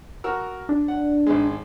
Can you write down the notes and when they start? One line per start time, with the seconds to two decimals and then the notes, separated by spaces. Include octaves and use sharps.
0.24 F#4 A#4 E6
0.69 D4
0.88 F#5
1.27 G#1 G#3